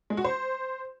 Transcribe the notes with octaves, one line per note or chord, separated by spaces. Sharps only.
G#3
F#4
C5